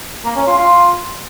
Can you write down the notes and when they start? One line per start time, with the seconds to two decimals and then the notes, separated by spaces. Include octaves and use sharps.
0.25 A#3
0.36 C#4
0.47 F4
0.58 F4